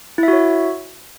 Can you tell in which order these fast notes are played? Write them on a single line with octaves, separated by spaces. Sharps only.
E4 E5 F#4 C#5